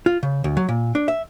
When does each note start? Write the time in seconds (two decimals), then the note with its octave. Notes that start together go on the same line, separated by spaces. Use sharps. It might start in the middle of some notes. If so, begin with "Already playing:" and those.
0.06 F4
0.23 C#3
0.44 D2
0.57 F#3
0.69 A#2
0.95 D4
1.08 E5